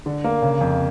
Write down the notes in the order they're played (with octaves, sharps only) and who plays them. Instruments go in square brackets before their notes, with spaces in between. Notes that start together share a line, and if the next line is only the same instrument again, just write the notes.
[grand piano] D3
A#3
C#3
F2